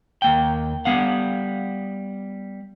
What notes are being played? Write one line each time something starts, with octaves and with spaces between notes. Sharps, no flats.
D#2 A#3 G5
G3 B3 F5 F#5